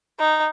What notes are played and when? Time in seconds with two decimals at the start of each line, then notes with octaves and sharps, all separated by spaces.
0.19 D#4